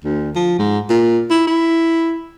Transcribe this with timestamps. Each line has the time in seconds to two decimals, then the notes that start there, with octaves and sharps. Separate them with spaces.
0.04 D2
0.36 F3
0.59 G#2
0.90 A#2
1.31 E4
1.47 E4